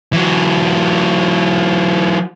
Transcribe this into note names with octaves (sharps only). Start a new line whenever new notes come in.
E3 F#3